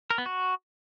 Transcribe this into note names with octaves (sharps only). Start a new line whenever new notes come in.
A#4
B3
F#4